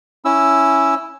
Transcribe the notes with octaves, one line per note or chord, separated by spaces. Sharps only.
C#4 E4 E6